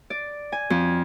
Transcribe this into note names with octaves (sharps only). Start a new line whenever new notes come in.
D5
G#5
F2